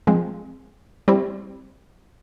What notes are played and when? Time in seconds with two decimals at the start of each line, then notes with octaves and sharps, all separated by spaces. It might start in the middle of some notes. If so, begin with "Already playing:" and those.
0.07 F3 G#3 C4
1.08 G3 C4 E4